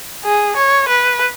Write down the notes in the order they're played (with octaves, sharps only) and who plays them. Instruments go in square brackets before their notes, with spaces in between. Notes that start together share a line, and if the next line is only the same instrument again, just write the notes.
[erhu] G#4
C#5
B4